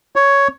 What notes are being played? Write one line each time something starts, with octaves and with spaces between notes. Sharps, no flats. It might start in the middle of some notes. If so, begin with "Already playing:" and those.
C#5